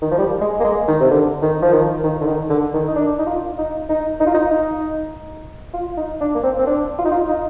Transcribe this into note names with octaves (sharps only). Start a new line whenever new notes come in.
D#3
F3
G3
G#3
A#3
G#3
D#3
C3
D3
D#3
F3
D#3
D#3
D3
D#3
D3
D#3
D#4
D4
D#4
F4
D#4
D#4
D#4
F4
D#4
D#4
F4
D#4
D4
A#3
C4
C4
D4
F4
D#4
F4
D#4